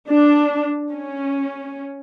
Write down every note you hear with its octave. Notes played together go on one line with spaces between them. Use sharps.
D4
C#4